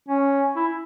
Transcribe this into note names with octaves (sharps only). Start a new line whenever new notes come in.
C#4
E4